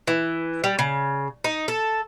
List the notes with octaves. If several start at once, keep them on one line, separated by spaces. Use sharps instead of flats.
E3
G3
C#3
D#4
A4